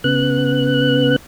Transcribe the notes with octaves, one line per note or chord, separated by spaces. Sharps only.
C#3 B3 F#6